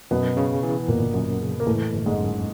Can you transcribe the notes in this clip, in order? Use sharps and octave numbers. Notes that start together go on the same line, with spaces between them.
F#2 B2 B3
C#3
E3
G1 A#2 A#3
F#2
C#3
A#3
A2 E3 A3
G1
G#2 G#3
F#2